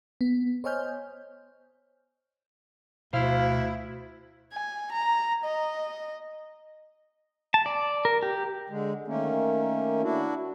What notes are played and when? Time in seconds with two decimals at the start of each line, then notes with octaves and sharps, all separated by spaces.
0.21 B3
0.64 C5 C#5 D#5 G#5 F6 G6
3.13 D2 B2 E4 C5 F5
4.53 G#5
4.92 A#5
5.44 D#5
7.54 A5
7.66 D5
8.05 A#4
8.23 G4
8.68 D3 G#3
9.07 D#3 A3 A#3 C#4
10.02 D4 E4 F#4